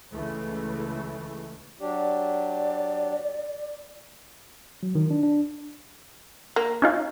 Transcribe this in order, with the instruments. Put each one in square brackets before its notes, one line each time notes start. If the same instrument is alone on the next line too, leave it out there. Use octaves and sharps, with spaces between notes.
[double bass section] C#2 C#3 E3 A3
[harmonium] F#3 D4 G4 [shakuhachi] D5
[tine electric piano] F#3
D#3
D4
D4
[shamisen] A#3
[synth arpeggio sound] C#4 D#4 F4